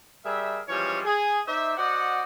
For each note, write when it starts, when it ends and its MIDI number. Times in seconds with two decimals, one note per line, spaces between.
0.25 0.60 55
0.25 0.60 68
0.25 0.60 70
0.25 0.60 76
0.68 1.00 52
0.68 1.00 53
0.68 1.00 55
0.68 1.00 56
0.68 1.00 61
0.68 1.00 73
1.05 1.39 68
1.47 1.73 63
1.47 1.73 72
1.47 1.73 74
1.47 1.73 76
1.78 2.23 66
1.78 2.23 72
1.78 2.23 74
1.78 2.23 75
1.78 2.23 78